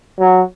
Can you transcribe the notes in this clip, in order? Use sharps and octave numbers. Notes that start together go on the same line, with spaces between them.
F#3